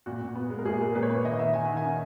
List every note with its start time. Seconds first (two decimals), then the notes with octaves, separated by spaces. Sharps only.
0.06 A#2 F#4
0.21 A#2
0.35 B3
0.50 G#3
0.59 A#4
0.65 A#2 G#4
0.80 G#3 A#4
0.95 A#2 B4
1.03 C#5
1.10 A#2 B4
1.25 D#3 D#5
1.39 D#3 E5
1.54 D#3 G#5
1.65 D#3 F#5
1.77 G#5
1.84 C#4